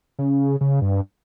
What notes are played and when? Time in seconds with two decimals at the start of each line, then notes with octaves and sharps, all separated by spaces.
0.19 C#3
0.61 C#3
0.82 G2